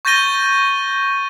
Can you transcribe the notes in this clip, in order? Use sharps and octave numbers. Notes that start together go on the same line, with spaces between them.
C#6 G6 A6 A#6 D#7 G7